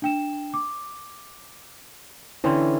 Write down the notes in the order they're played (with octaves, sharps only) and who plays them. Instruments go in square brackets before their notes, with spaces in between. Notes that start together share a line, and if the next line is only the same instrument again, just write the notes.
[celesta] D4 G5 E7
D6
[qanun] D3 E3 C#4 [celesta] E4 G5 C6